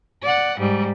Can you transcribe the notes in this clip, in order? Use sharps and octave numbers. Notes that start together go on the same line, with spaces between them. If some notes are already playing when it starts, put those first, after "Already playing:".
D5 F#5
G#2 G3